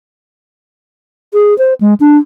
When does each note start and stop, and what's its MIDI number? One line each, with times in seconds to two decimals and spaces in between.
1.33 1.56 68
1.58 1.74 72
1.81 1.94 56
2.00 2.17 62